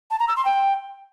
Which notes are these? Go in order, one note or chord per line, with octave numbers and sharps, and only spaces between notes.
A5
A#5
E6
C6
G5